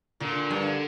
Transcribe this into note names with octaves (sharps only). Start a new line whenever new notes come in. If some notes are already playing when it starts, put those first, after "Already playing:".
A#2 D3
G2